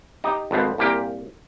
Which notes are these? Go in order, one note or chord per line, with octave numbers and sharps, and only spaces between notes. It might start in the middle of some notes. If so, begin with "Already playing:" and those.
D#4 G4
G#1 F2 B3 C5
C2 A#2 A#3 G4